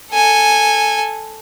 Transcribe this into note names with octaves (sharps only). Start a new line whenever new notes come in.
A4 G#5